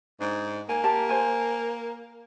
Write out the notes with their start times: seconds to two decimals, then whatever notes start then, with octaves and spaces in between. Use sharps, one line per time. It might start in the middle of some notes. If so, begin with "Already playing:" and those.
0.21 G#2 D4
0.69 A#3 G#5
0.84 G4 A5 A#5
1.09 C5 G#5